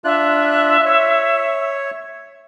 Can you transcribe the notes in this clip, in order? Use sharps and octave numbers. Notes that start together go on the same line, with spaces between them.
D4 F4 E5 F#6
C#5